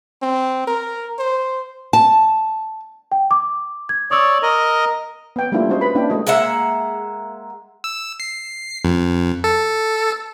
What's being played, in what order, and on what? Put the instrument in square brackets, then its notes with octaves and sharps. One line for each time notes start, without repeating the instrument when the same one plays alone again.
[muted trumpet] C4
A#4
C5
[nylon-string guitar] A5
[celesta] G5
D6
G#6
[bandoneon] C#5 D5 [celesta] D#6 E6
[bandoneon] A#4 D#5
[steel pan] B3 G5
G3 A3 A#3 D4 E4 F4
G#3 C#4 F#4 C5 C#5 D#5
B4 B5
A#3 C#4 D4 E4 G5
G#3 A3 F#4 D#5
[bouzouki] G#3 A#3 E5 F#5
[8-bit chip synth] E6
C7
F2
A4